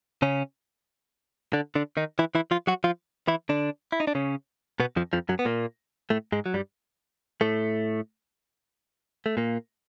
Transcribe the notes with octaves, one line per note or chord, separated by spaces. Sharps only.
C#3 C#4
D3 D4
D3 D4
D#3 D#4
E3 E4
E3 E4
F3 F4
F#3 F#4
F3 F4
E3 E4
D3 D4
E4
D#4
D4
C#3 C#4
B2 B3
F2 F3
F2 F3
F#2 F#3
B3
A#2 A#3
A2 A3
G#2 G#3
F#3
G2 G3
A2 A3
A3
A#2 A#3